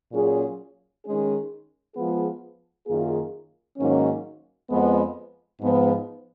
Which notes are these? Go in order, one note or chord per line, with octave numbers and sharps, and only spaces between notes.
A#2 F#3 C#4 F4 G#4
D#3 G#3 C#4 G#4
F3 G#3 B3 F4 G#4
F#2 D#3 A#3 F4 G#4
G#2 D#3 F#3 A#3 C#4
F2 F3 G#3 B3
G#2 F3 B3